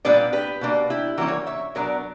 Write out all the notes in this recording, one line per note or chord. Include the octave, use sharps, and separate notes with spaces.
A#2 G3 B3 D4 B4 D5
G4 B4
B2 A#3 D4
E4 G4
E3 G3 A#3 C#4 F#4 A#4
A#4 C#5
C#5 E5
B2 F#3 B3 D4 A#4 C#5